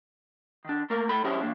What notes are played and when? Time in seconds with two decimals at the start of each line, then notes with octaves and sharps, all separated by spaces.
0.65 D#3 D4
0.90 A3 A#3 A#4
1.09 A3 A4 B5
1.24 F#3 C#4 E4 G4 G#4 C5
1.41 E3 A#3 D4